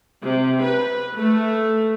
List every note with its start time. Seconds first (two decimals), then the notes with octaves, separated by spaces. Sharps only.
0.24 C3
0.62 B4
1.18 A3